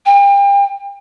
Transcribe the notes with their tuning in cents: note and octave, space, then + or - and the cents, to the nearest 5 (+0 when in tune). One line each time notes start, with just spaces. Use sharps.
G5 +35